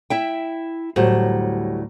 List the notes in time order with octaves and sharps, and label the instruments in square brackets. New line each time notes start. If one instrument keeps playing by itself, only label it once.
[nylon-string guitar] E4 E5 G5
[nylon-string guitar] D2 A2 C5 [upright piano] F#3 G3 F#4